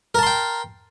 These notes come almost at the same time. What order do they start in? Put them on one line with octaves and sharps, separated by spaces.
A#4 A5 C6 G5